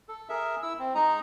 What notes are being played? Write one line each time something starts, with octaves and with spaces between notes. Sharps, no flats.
A4
G#4 A#4 E5
E4 E6
C4
G#3 D#4 D#5 A#5